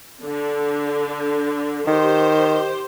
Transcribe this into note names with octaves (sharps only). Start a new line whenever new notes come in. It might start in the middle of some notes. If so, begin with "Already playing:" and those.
D3
D#3 G4 C5